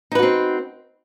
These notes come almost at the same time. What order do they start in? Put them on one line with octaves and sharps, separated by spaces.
D#4 B4 F#4 C4